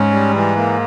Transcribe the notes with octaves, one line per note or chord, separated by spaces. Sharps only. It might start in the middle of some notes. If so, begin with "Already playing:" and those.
Already playing: G#2 C#4
G3
E3
A#3